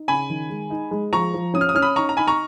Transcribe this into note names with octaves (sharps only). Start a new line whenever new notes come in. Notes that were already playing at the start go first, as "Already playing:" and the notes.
Already playing: D#4
C#3 G#5 B5
D#3
G#3
D#4
G#3
F3 A#5 C#6
F3
C#4 D#6
F6
D#6
C#4 F6
B5 D#6
D#4 A#5 C#6
A#5
D#4 G#5 B5
A#5 C#6